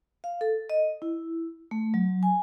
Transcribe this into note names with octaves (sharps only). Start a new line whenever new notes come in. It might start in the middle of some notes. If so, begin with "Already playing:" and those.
F5
A4
D#5
E4
A3
F#3
G#5